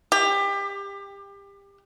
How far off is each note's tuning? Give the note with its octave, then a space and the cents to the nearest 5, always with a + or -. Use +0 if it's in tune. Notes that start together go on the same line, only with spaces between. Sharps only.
G4 +25